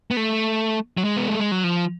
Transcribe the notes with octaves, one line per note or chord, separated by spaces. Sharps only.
B3
A3
F#3
G#3
B3
A3
G#3
F#3
F3